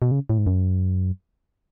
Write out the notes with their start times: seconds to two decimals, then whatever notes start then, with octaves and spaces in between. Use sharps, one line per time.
0.02 B2
0.11 C#3
0.30 A2
0.38 G#2
0.47 F#2